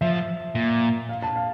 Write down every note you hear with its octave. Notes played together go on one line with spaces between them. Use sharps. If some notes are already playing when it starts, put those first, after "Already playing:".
F3 E5
A#2
F5
A5
F5